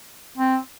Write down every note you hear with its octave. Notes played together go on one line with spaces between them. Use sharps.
C4